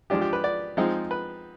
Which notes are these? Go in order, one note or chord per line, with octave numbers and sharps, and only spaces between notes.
F3 G#3 D4 G4
G4
B4
D5
F3 G#3 C4 D#4
B4